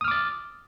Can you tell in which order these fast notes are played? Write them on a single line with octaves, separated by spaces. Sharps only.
D#6 F6 D6 A6